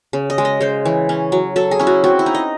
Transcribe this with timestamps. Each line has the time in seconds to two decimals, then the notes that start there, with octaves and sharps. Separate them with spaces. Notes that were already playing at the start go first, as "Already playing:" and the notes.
0.13 C#3
0.30 D#5
0.38 G#3
0.45 D#5
0.61 C#3 C5
0.85 E3
1.09 C#4
1.32 F#3
1.56 F#3 A4
1.71 G#4
1.79 C#4 E4
1.87 F#4
2.04 C4 F#4
2.19 E4
2.26 D#4
2.35 D#5